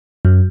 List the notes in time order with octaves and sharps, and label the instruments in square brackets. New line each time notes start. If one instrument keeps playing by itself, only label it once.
[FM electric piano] F#2